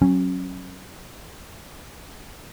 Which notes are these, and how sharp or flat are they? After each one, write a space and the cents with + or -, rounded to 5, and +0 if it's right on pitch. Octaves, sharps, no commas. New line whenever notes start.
F#3 +0 C#4 -25